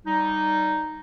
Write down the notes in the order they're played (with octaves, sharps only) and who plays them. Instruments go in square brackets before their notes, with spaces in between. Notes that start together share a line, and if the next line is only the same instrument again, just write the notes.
[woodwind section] G3 D#4